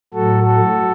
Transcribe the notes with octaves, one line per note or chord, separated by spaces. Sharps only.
A2 F#3 F#4 A4
F#4 A4